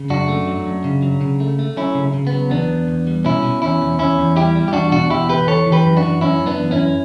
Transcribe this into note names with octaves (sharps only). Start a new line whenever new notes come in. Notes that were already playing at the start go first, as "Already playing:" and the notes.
Already playing: C#3
F#2 D4 F#4
A3
F#3
F#2
C#3
F#3
C#3
A3
A3
F#3 C#4 E4
C#3
C#3
B3
F#3
E2 B3 D4
E2
E2
G3
B2 C#4 E4
B2
E2 C#4 E4
E2
E2 C#4 E4
E2
G3 E4 G4
G3
G4
E2 D4 F#4
B2 D4 F#4
E2 E4 G4
E2 G4 B4
E3 A4 C#5
E3
G4 B4
F#2
D4 F#4
E3
F#2 C#4 E4
F#2
B3 D4
E3
C#4 E4
F#2